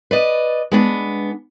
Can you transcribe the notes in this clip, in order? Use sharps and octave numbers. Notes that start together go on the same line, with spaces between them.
B4 D5 D#5
G#3 B3 D4